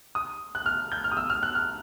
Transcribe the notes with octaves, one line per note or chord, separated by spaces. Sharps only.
D#6
F#6
F6
G6
F6
D#6
E6
F6
F#6
F6